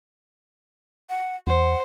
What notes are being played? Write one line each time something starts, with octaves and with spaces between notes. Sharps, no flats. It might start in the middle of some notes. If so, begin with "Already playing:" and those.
F#5
E2 C5 F#5